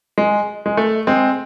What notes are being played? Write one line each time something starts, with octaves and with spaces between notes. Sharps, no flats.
G#3
G#3
A3
G#3 C4